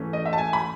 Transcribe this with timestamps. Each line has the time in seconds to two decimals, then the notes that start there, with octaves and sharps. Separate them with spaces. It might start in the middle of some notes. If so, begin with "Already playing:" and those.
Already playing: G#2 E3 A3 C#4
0.13 D#5
0.26 E5
0.33 A5
0.38 G#5
0.53 B5